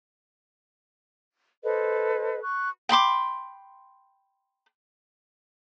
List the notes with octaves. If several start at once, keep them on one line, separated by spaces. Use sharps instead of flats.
A4 B4 C5 D#5
C#6 F#6
G5 B5 C6 D6